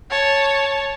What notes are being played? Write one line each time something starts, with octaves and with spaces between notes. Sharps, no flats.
C#5 A5